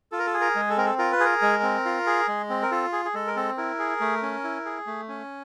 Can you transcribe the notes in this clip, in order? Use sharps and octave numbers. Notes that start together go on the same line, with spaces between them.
F4 A4
A#4
A4
G#4
A#4
G#3
A4
C4 A#4
A4
F4 A#4
B4
G#4 A#4
G#3
C4
F4
G#4
G#3
C4
A#4
F4 A4
G#4
G#4
G#3 A4
A#4
C4 A4
E4 A#4
G#4
A3
C#4
E4
G#4
A3
C#4